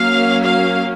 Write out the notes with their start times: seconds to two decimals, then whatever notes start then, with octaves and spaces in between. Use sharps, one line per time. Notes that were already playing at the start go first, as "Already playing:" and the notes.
Already playing: F#3 A#3 C#4 F5
0.44 F5